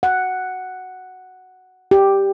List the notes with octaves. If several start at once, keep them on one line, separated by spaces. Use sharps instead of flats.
F#5
G4